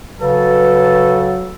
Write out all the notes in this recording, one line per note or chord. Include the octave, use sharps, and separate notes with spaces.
C#3 F#3 A4 B4